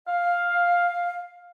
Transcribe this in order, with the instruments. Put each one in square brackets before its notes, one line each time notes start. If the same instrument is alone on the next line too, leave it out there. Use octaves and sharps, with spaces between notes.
[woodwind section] F5